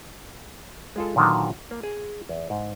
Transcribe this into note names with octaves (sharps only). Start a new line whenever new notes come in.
G#3 F4 A4
A#2 D3 D#3 F#3 B3 F#4
A#3
G#4
E2
G#2